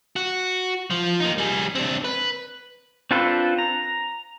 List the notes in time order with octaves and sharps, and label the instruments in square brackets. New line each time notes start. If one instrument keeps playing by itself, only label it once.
[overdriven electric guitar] F#4
F3
A#3 D#4
G3 G#4
C4 D4
B4
[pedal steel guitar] C4 D4 F4 A4 B4
A#5